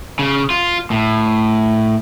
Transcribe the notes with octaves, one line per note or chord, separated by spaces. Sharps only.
C#3
F4
A2